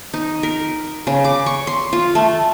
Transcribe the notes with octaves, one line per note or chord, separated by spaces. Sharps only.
D#4
A#4
C#3
D6
C#6
C6
F4
A3